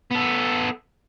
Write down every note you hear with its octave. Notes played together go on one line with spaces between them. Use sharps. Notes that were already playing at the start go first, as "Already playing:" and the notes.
B3 A4